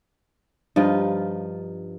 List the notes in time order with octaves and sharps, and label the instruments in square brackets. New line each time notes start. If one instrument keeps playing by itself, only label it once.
[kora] G2 F3 D#4 F4